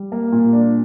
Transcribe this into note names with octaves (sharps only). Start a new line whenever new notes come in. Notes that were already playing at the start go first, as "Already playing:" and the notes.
Already playing: G3
A#3
A#2
D4